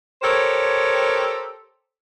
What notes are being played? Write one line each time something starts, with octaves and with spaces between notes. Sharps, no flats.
G4 A4 A#4 C5 C#5